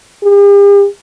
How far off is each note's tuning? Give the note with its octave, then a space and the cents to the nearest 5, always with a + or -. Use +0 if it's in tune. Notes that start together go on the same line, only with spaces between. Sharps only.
G4 +45